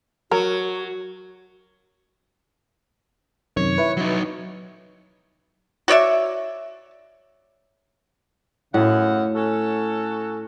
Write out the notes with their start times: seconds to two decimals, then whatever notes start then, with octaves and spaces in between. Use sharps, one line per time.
0.31 F#3 F#4 A#4
3.57 F#2 C3 D#3 C#5
3.78 E4 B4
3.97 F#3 D#4
5.88 F#4 C#5 D5 E5
8.74 F#2 A2 C#3 F#5
9.35 C#4 F#4 A4